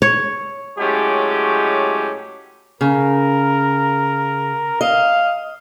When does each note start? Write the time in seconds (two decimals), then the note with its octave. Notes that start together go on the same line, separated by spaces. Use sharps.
0.02 C#5
0.79 A2 F#3 G#3 C#4 G4
2.81 C#3 A#4
4.81 D#5 F5